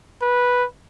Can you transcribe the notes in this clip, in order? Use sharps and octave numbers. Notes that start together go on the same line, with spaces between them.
B4